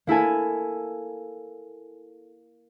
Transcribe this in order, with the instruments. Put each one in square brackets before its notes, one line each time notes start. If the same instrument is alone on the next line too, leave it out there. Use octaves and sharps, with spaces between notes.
[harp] A#3 E4 A4 G#5